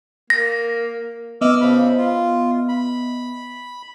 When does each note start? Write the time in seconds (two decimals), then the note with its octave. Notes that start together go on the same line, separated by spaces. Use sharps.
0.30 A#3 A#6
1.41 B3 D#5 E5 D6 E6 F6
1.61 C#3 F3 B5
1.98 F4
2.69 B5